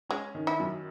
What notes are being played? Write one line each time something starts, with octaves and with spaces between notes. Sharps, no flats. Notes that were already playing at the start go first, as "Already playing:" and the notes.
G#3 C#4
D#3
E4
F#2